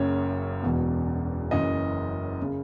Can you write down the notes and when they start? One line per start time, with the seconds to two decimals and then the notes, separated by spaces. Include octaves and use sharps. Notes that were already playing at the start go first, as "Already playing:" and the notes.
Already playing: F#1 F#2 C#3 C#5
0.63 E1 E2 B2
1.51 F#1 F#2 E3 D#5
2.42 C#3